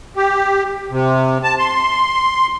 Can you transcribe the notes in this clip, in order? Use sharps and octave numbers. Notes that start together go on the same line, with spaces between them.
G4
C3
A5
C6